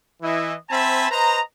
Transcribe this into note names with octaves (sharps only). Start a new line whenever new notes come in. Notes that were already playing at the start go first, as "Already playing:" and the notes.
E3 E4 D#5
C4 C5 E5 G#5 A5 B5
B4 C5 D#5 A#5